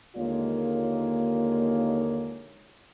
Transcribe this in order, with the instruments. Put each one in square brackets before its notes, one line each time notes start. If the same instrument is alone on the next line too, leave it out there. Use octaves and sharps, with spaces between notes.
[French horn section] D#2 D3 G#3 A#3 F4 C#5